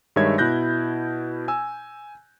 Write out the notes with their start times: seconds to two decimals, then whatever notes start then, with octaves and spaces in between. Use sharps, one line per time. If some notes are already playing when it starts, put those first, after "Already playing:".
0.16 G2 D#3 G#3 C#5 E5 G#6
0.38 B2 E4 F#6 G6 A#6
1.48 G#5 E6